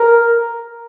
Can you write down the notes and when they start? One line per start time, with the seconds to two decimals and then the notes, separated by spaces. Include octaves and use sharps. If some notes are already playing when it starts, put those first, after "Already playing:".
Already playing: A#4